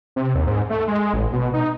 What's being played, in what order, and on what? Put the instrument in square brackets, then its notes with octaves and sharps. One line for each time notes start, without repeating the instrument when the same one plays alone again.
[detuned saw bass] C3
D#2
G#2
A3
G#3
A1
B2
D#4